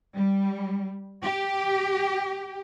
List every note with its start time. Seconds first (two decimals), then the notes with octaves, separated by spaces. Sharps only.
0.15 G3
1.23 G4